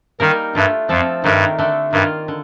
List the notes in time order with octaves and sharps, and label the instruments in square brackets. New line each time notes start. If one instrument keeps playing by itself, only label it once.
[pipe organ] D#3 [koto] G3 A#3 D#4 A#4
[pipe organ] G2 [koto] A3 D4 F4
[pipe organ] F2 [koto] F3 C4 F4 A4
[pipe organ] G2 [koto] D#3 A3 D4 G4 A#4
[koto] D3 A3 D4
[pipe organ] G2 [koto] D#3 A#3 F4
[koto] D3